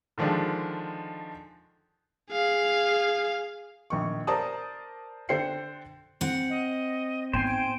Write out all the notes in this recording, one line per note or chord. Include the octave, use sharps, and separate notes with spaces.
D3 D#3 F3 G#3 D4
G#4 F5
A#1 D#3 C#6
A#4 C5 D5 A5 A#5 D#6
D3 C5 D5 G5 C7 C#7
C4 F#5
D#5
G#2 B3 C5 G5 G#5 C6
D7